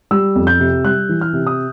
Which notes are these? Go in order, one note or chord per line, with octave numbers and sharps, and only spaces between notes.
G3 E6
F2
G6
C3
G3 F#6
E3
F6
C3
D#6